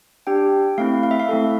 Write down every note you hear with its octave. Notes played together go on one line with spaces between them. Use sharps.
D4 G4 G5
A3 C4 E4 F5
F5
E5
F5
A3 C4 E4 A4